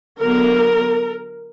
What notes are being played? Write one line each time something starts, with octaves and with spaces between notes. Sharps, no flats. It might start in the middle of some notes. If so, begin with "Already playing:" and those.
D3 F#3 B3 A#4